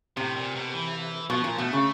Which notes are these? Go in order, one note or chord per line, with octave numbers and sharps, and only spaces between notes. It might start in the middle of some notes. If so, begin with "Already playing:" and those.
A2 C3
A#2
B2
E3
B2 F3
A#2
B2 A3
C#3